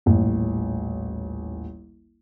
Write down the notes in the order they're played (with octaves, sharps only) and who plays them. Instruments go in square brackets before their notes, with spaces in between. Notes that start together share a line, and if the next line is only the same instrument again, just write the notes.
[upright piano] D#1 A1